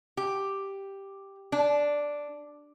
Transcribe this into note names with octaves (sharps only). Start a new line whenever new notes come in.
G4
D4